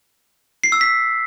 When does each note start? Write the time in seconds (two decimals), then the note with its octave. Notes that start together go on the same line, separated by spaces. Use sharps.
0.64 C7
0.72 E6
0.81 B6